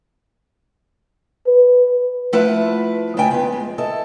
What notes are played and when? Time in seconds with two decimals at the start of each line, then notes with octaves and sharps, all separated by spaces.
1.47 B4
2.33 F3 A3 E4 B4 F#5
3.17 C#3 A3 D#5 G5 G#5
3.31 F2 B3
3.52 G#3
3.78 E4 A4 D#5